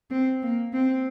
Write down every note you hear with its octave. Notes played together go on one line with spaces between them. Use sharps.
C4
A#3
C4